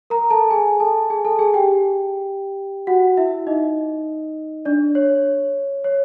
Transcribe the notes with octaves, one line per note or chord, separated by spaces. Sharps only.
A#4 A#5
A4 A5
G#4 G#5
A4 A5
G#4 G#5
A4 A5
G#4 G#5
G4 G5
F#4 F#5
E4 E5
D#4 D#5
D4 D5
C#5
C#5